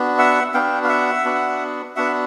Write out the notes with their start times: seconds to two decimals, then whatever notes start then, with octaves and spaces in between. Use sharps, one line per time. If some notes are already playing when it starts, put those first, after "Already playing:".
Already playing: B3 D4 F#4
0.18 E5 F#5
0.54 B3 D4 F#4 F5 G5
0.84 F5
0.89 E5 F#5
1.25 B3 D4 F#4
1.96 B3 D4 F#4 E5 F#5